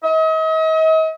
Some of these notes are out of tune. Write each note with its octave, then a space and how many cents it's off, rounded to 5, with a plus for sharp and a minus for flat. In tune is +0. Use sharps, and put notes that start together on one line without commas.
D#5 +40